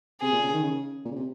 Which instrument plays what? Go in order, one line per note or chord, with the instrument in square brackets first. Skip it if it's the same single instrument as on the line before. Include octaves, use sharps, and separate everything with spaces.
[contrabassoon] C3 [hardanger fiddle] G#4
[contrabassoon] A#2
C#3
D#3
C#3
A#2
C#3
C3